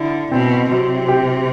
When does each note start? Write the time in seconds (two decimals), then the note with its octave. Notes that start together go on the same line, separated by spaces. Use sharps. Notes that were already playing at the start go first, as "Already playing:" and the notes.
Already playing: D3 E4
0.31 B2 C4
0.70 C3 F#3
1.08 G4